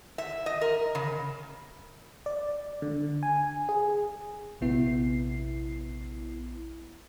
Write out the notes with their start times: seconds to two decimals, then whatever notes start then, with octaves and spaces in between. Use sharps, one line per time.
0.18 E5
0.46 D#5
0.61 A#4
0.95 C#3
2.26 D5
2.82 D3
3.23 G#5
3.69 G#4
4.61 A#1 C3 B3 E4 C7